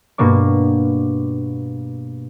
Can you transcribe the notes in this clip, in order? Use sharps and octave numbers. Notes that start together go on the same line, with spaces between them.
G2 B2 A#3 D5 C#6